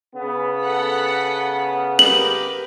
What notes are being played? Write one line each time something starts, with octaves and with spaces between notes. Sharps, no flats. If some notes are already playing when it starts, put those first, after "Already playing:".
C#3 B3
A4 F#5 B6
G4 A#4 B4 F#7